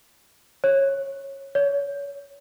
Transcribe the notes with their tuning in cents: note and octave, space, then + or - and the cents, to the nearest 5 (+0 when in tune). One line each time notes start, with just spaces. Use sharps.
C#5 -15
C#5 +30